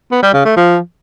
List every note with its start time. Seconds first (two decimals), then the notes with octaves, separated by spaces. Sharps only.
0.11 B3
0.23 G3
0.34 C#3
0.45 A3
0.56 F3